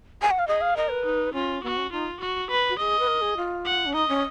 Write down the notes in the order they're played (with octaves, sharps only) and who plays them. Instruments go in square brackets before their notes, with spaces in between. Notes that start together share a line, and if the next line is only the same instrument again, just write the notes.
[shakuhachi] G#5
F#5
F5
[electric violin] G#4 [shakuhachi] D#5
[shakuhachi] F5
[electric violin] A#4 [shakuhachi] D#5
[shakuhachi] B4
[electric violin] D#4
[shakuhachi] C#4 [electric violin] F4
[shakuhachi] B3 [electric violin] F#4
[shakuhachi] C#4
[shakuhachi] D#4 [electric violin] F4
[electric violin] F#4
B4
[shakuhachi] F#4
[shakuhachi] G#4 [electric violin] D#5
[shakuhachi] B4
A#4
G#4
F4
[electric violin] F#5
[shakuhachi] C#4
[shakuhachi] D#4 [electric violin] D#5
[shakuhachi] C#4